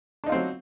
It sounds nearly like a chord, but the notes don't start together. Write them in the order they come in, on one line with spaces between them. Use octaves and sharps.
D4 D#4 F4 C4 F#3